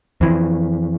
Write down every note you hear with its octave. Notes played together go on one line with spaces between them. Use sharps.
F2 E3